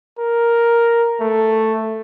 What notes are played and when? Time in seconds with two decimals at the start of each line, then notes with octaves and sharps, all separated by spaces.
0.19 A#4
1.20 A3